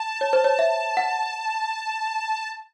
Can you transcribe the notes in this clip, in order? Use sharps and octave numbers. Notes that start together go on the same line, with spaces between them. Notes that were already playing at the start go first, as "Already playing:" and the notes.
Already playing: A5
C#5
C5
C#5
E5
F#5